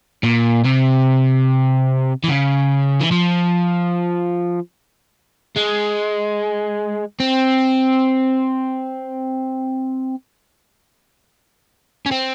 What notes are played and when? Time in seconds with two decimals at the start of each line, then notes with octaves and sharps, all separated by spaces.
0.24 A#2
0.65 C3
2.24 E3
2.28 C#3
3.00 E3
3.11 F3
5.57 G#3
7.20 C4
12.06 C#4
12.11 C4